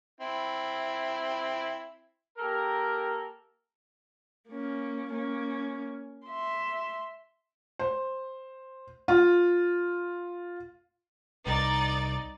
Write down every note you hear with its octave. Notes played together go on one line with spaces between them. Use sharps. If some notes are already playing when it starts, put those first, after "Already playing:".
C4 E4
A#3 G4 A4 A#4
A#3 C#4
A#3 C#4
E5 C6
C5
F4
C2 D#4 D5 A6